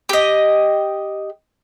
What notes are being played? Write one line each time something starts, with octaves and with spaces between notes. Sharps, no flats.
G4 D#5